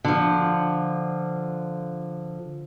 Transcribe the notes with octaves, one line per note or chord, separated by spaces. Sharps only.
D3 F3